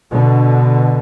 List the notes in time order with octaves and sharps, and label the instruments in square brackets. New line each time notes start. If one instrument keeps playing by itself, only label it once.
[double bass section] B2 D3